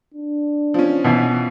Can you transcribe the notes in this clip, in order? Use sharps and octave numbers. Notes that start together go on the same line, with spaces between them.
D4
F3 C#4
B2 E3